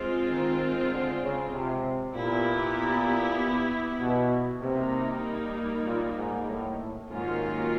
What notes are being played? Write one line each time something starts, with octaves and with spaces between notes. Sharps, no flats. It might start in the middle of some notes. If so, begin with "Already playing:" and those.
Already playing: G#3 C4 F4
D#3
D3
C#3
C3
A#2 B3 E4 G4
B2
C3 G3 A#3 D#4
A#2
G#2
A2
G#2 D#3 F#3 A#3 C#4 F4